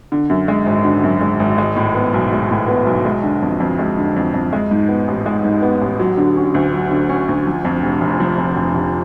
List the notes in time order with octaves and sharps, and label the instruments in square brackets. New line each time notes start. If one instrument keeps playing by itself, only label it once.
[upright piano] D3
F#2
G#3
G#1
D3
F#2
G#3
G#1
G#3
A2
B3
B1
G#3
A2
B3
B1
G#3
D3
F2
F2
G#3
D3
F2
F2
G#3
G#2
B3
A1
G#3
G#2
B3
A1
F#3
D3
C#4
D2
F#3
D3
C#4
D2
F3
F2
F1
F1
F3
F2
F1
F1